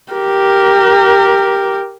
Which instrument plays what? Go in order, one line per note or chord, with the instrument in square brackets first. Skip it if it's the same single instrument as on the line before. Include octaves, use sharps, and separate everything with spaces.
[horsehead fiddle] G4 A#4